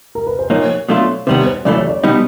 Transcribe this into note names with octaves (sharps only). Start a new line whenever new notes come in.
A#4
B4
C5
A#2 F3 A#3 D#4 C#5
B2 F#3 A3 D4 F4
C3 D#3 G3 B3 C5
C5
F#2 C#3 E3 A3 D5
C#5
D5
B2 G3 B3 D#4